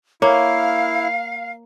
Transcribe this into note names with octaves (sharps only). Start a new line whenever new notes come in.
A#3 E4 C#5 F5